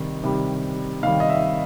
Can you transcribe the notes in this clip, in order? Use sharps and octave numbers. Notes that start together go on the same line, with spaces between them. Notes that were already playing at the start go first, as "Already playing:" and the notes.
Already playing: C3 D#3 G3
C3 D#3 G3
C3 D#3 G3 F5
D#5
E5